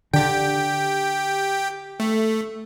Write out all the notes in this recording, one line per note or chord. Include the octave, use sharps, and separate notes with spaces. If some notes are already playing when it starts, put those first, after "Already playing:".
D3 G4 G5
A3